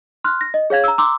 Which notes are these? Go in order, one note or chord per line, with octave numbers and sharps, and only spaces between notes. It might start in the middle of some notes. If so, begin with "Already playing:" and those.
C6 F6 F#6
A#6
D#5
G#4 C#5 F5 G#6
A#5 E6
A#5 C6 D6 E6